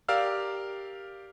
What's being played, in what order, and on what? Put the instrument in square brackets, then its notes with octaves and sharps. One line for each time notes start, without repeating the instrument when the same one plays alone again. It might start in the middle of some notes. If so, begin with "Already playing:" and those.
[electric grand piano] G4 A#4 D5 F5 E6 F6